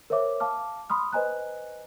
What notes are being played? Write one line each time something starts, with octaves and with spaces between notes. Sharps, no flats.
A#4 C5 C#5 E5 D6
F5 A5 D6 F6
B5 C6 D#6 F6
B4 C5 D#5 G#5 A#5 F#6